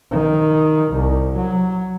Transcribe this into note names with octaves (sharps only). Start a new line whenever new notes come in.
D#3
C2
F#3